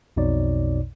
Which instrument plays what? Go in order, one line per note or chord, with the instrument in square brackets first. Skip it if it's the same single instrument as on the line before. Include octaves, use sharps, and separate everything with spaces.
[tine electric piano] B1 F2 B2 D#4 C#5 D5